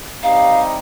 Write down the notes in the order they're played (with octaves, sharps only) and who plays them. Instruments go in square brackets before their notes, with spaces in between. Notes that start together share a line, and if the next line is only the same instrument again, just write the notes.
[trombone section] C3 G3 D#4 [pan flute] F5